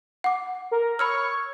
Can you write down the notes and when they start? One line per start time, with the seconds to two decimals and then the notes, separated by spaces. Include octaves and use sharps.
0.24 F#5 D6
0.71 A#4
0.99 C#5 B5 C#6 E6 F6